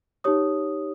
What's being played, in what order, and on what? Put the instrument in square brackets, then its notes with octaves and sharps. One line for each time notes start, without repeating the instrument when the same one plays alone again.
[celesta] D#4 G4 C#5 D#6